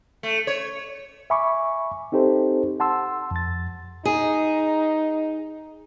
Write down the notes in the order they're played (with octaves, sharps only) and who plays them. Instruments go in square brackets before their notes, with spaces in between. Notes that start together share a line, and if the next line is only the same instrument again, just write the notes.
[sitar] A3
C#5
[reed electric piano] E5 G#5 B5 C#6 D6
C4 D#4 G4 A4 C5
F#5 A5 C6 E6
F2 A6
[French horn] D#4 [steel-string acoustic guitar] G#4